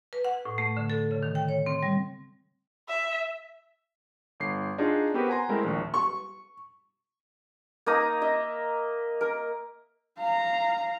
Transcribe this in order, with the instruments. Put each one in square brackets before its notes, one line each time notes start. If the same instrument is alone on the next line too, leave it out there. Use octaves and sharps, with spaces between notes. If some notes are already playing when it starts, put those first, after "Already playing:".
[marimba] B4
F#5
A2
A3
D3
A4
C#3
D#3
G5
C#5
C4
G3
[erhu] E5
[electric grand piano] G1 C7
D4 D#4 F4 F#4 G#4
B3 C4 F#4 G4 A#4 B4
F#5 G#5 A#5 C6
G#3 A3 C4 E4 A#4
A#1 D#2 C#6
[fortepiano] C#6
[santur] A#3 D#4 A#5 D#6
D#5 E5
A#4
[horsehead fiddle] F5 A#5